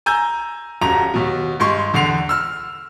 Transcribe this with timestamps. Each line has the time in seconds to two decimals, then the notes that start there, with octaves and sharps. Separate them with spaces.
0.06 G#5 A#5 E6 G6
0.82 D#1 F#2 A#5 F7
1.14 D#2 B2
1.60 G2 G#3 C6 C#6
1.94 E2 D3 C7 F7
2.29 E6 F6